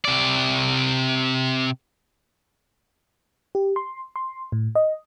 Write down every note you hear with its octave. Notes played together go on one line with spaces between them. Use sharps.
C3 D5
G4
C6
C6
A2
D#5